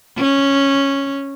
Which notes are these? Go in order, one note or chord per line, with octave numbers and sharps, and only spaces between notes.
C#4